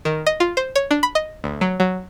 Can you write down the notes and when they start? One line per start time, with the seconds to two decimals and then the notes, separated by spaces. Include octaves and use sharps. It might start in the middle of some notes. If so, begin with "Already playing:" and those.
0.05 D#3
0.26 D#5
0.40 F4
0.57 C5
0.75 C#5
0.91 D4
1.03 B5
1.15 D#5
1.44 D2
1.61 F#3
1.80 F#3